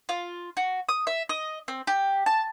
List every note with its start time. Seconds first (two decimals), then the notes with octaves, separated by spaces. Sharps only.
0.09 F4
0.57 F#4
0.89 D#6
1.07 E5
1.29 D#5
1.68 C4
1.87 G4
2.26 A5